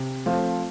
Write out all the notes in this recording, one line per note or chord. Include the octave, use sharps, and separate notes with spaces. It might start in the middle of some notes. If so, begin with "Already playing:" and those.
Already playing: C3
F3 A3 C4 F4